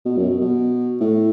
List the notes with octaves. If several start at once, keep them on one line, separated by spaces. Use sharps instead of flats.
B2
F#2
B2
B2
A2